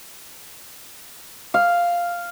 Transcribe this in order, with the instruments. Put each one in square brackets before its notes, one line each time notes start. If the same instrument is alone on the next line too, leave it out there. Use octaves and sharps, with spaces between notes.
[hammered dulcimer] F5